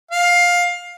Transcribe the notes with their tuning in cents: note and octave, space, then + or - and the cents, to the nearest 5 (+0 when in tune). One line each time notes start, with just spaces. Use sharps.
F5 +15